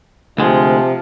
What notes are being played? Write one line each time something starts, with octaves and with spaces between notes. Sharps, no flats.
D2 C3 F3 G#3